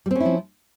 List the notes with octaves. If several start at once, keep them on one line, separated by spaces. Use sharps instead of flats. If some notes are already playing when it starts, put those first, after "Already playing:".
F3 G3 C4 C#4 E4